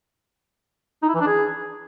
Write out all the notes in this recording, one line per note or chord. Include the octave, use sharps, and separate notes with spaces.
D#4
E4
E3
D4
G#4